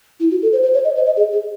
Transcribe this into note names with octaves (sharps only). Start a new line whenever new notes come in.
E4
F#4
A4
C5
C5
C#5
D#5
C5
D#5
G#4
G#4